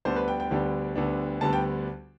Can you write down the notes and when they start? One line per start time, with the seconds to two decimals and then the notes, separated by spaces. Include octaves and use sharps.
0.05 D2 D3 G3 B3 D4 C5
0.16 B4
0.28 G5
0.40 G5
0.51 D2 D3 G3 B3 D4
0.96 D2 D3 G3 B3 D4
1.41 D2 D3 G3 B3 D4 A5
1.53 G5